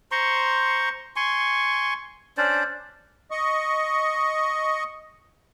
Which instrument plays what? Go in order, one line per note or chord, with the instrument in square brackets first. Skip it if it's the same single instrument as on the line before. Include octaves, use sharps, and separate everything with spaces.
[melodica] C5 A#5 C6 C#6
G#5 C6 C#6
C#4 D4 C5 D5
[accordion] D#5 C#6